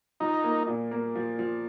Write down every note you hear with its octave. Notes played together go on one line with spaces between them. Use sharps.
F3 D#4
A#3
A#2
A#3
F3
F3